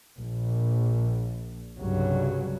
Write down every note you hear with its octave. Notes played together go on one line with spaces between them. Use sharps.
A#1
C2 G2 C#3 F#3